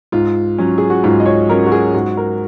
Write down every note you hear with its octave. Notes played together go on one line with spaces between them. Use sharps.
G#2 F4
F#3 C#4
G#4
F#4
G#2 F4
D#5
C#5
F#3 C#4 A#4
F#4
G#4
G#2 F#4
A#4